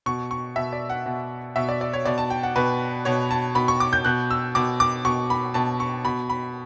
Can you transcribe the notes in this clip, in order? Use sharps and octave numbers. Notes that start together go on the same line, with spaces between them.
B2 C#6
C#6
B2 E5
D5
F#5
B2
B2 E5
D5
D5
C#5
B2 D5
A5
G5
F#5
B2 B4
B2 C#5
A5
B2 B5
C#6
D6
G6
B2 F#6
E6
B2 D6
D6
B2 C#6
B5
B2 A5
C#6
B2 B5
B5